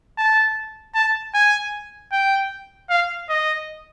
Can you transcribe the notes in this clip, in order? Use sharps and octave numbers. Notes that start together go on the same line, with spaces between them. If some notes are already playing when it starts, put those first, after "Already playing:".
A5
A5
G#5
G5
F5
D#5